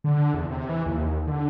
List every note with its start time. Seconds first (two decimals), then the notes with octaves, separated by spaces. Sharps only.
0.04 D3
0.34 E2
0.50 C3
0.69 E3
0.86 D#2
1.27 D3